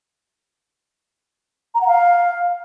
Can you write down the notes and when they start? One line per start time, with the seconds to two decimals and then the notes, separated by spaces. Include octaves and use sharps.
1.75 A#5
1.81 F#5
1.87 F5